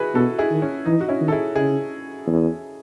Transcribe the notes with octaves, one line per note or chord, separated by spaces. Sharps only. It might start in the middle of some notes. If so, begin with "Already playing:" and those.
Already playing: E4 F#4 G#4 B4
B2 F#4 A4
E4 G#4
D#3
C#4
E3 D#4
F#4
C#4 E4
D#3
A4
E4 G#4
C#3 E4 G#4
E2